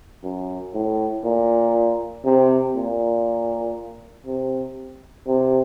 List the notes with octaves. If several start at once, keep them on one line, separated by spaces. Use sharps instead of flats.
F#2
A2
A#2
C3
A#2
C3
C3